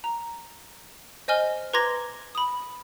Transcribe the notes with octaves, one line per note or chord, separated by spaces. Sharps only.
A#5
C5 D#5 G#5 F6 G7
B4 A#5 C6 D6 G#6 A#6
B5 D#6